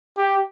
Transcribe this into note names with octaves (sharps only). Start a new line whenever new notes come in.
G4